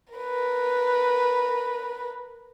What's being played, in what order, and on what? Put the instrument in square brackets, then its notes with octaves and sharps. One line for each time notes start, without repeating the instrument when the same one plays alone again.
[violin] A#4 B4